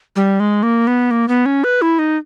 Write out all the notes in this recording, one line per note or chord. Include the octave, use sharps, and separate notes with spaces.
G3
G#3
A#3
B3
A#3
B3
C#4
B4
E4
D#4